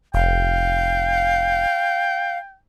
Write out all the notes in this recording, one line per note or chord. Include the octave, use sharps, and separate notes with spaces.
F1 F5 G5